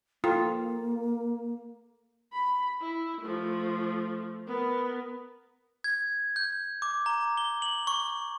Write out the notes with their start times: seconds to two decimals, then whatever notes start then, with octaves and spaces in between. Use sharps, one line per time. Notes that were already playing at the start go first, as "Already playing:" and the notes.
0.24 A#3 F4 A4 G5 A#5
2.33 B5
2.81 E4
3.22 F3 A3
4.47 B3 A#4
5.84 G#6
6.36 G6
6.82 D6
7.06 A#5
7.37 G7
7.62 F#7
7.87 C#6